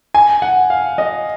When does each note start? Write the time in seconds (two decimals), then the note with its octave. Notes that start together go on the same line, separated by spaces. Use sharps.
0.15 G#5
0.42 F#5
0.70 F5
0.98 D#5